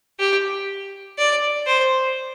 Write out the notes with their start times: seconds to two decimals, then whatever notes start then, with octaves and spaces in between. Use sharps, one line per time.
0.19 G4
1.18 D5
1.67 C5